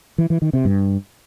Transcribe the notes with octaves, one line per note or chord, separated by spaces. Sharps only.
E3
E3
D#3
C3
G2